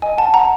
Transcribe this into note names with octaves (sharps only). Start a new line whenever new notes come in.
D#5 G#5
F#5 A5
F#5 A#5